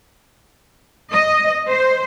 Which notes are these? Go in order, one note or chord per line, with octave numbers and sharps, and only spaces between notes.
D#5
C5